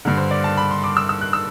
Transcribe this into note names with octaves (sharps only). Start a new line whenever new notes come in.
G2 D3
C5
D5
A5
B5
C6
D6
E6
E6
F#6
E6